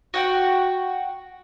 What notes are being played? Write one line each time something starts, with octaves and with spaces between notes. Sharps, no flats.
F#4 F#5 G5